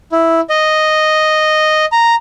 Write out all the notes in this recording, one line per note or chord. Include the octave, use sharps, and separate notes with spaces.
E4
D#5
A#5